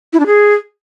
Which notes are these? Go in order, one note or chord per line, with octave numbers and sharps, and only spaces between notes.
E4
D4
G#4